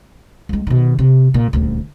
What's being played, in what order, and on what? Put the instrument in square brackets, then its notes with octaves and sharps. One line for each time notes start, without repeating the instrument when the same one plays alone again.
[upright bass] C#2 G#3
B2 D#3
C3
A#2
D#1 D2